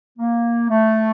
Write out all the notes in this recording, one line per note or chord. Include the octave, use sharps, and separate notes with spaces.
A#3
A3